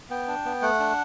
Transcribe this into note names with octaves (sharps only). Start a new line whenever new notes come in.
B3 G5
D4
B3
A3 F#5
D4